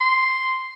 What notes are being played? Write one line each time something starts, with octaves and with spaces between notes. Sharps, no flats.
C6